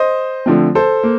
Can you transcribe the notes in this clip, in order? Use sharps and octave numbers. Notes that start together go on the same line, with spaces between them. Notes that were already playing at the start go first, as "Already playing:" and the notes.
Already playing: C5 D#5
D3 F3 A3 C4
A4 C5
A#3